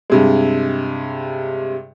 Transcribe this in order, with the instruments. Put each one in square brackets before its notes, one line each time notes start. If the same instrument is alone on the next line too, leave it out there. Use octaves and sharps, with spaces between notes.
[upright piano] G2 C3 G#3